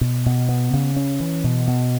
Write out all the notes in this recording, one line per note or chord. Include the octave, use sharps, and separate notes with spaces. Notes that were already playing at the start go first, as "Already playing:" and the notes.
B2
B2
B3
C#3
C#4
E3
B2
B2